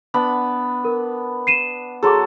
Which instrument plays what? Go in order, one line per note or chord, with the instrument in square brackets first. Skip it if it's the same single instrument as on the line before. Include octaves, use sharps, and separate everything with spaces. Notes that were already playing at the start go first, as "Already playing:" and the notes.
[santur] B3 D4 B5
[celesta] A#4
C7 D#7 E7
[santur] F#3 A4 [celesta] G#4 C6 D6